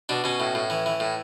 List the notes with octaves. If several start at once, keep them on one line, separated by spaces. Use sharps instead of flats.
B2 D4
B2 C#4
A2
A2
E3
E3
A2